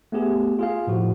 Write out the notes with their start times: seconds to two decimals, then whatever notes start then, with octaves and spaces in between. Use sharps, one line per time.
0.12 A3 B3 G4 G#4
0.59 F4 G#4 F5
0.87 A2 F3 F#4